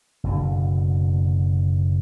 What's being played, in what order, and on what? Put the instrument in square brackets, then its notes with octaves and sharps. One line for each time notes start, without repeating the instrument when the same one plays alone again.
[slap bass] F#1 B2 D3